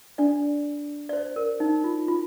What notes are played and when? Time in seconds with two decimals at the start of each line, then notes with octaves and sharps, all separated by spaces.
0.18 D4 D5
1.09 D5
1.13 C5
1.36 A#4
1.60 D#4
1.84 F4
2.08 F4